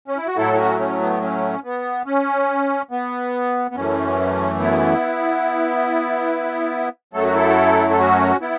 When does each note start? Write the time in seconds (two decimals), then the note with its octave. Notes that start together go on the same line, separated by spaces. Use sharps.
0.08 C#4
0.17 E4
0.27 F#4
0.37 A2 F#3 A3 E4 A4
0.53 E4
0.58 C#4 F#4
0.79 C#4
1.00 B3
1.22 C#4
1.64 B3
2.06 C#4
2.91 B3
3.71 B3
3.75 F#2 E3 A3 C#4
4.60 B3 E4
7.14 F#2 F#3 A3 A4
7.24 F#4
7.34 E4 A4
7.90 A4
7.98 C#4 F#4
8.41 B3 E4